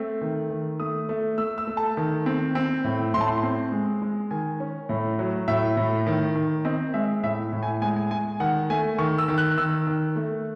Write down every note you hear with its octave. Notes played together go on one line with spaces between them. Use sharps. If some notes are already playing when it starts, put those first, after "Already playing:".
Already playing: A3 C4
D#3
D#3
A3 D#6
A3
A3 E6
E6
A3
A5
D#3
C4
C4
A2
A2 C6
A5
C6
C4
G#3
G#3
D#3 G#5
C#4
A2
F#3
A2 E5
A2
D#3
D#3
C4 D#5
G#3 E5
A2 E5
A2
G#5
G#3 G#5
G#5
G#3 G#5
D#3 F#5
A3 G#5
D#3 C#6
E6
D#3
F#6
D#3 E6
D#3
A3